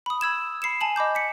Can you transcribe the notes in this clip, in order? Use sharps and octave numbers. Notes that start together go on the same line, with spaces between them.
B5 D#6
B5 E6 G#6 E7
B5 C7 C#7 E7
G#5 A5 F#7
D#5 B5 D6 G6
B6 C#7